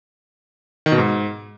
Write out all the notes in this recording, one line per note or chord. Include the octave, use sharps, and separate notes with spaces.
D#3
B2
G#2